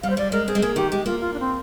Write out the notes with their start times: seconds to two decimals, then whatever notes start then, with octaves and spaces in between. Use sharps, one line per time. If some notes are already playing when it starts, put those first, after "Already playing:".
0.03 G3 F5
0.10 C5
0.17 G3 D5
0.32 G#3 A#4
0.47 C4 G#4
0.55 G#3
0.61 A#3 G#4
0.76 D#3 G4
0.91 G#3 G4
1.06 A#3 F4
1.20 F4
1.33 D4
1.40 C4